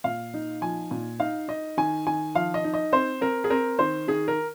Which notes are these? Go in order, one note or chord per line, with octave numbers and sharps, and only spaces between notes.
A#2 F5
D#4
F3 G#5
A#2
D#4 F5
D#4 D#5
D#3 G#5
D#3 G#5
F3 F5
D#5
D#4
D#5
C4 C5
C4 A#4
G#4
C4 A#4
D#3 C5
D#3 G#4
A#4